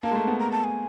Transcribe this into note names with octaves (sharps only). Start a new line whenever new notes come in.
A#3 A5
G#3
A3
B3
A#5
A5
G#5